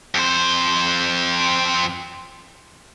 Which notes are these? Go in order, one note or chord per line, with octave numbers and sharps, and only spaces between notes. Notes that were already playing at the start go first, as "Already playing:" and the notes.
F2 C5